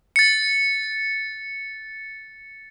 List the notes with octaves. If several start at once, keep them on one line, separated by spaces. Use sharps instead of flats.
A6 C#7